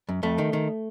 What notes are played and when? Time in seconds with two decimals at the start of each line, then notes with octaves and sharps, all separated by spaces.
0.09 F#2
0.23 F2 A3
0.38 D#3
0.53 D#3